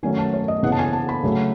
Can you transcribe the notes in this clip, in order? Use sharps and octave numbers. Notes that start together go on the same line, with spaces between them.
D#3 F#3 A3 C#4 G#5
A5
C#5
D#5
C#3 E3 B3 F#5
A5
G#5
A5
B5
C#3 F#3 A3